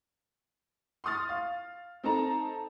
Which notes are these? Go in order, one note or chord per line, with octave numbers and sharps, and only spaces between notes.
C6 C#6 D#6 F6 A6
F5
C4 D#4 A4 D#5 A5 A#5